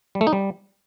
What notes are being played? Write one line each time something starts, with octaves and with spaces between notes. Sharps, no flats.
G3
A3
D#4
G3